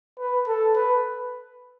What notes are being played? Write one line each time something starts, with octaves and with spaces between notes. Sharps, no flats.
B4
A4
B4